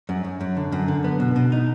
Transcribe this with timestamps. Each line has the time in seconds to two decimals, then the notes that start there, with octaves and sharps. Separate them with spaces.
0.09 F#2
0.25 F#2
0.41 F#2
0.57 D3
0.72 F#2
0.88 D3
1.04 B3
1.20 B2
1.36 B2
1.52 D#4